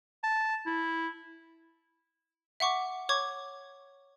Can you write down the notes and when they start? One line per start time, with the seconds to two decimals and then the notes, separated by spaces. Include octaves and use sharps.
0.23 A5
0.66 E4
2.60 E5 F#5 C#6 D6
3.09 C#5 C#6 D6 G#6